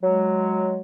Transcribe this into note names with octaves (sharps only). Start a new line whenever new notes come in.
F#3 G#3